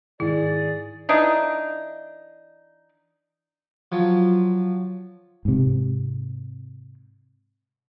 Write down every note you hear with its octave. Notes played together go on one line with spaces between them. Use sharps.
G#2 D#3 E4 G#4 D5
E3 D4 D#4
F3 F#3
G#2 C3